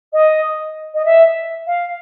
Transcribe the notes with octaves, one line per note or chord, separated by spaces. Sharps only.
D#5
D#5
E5
F5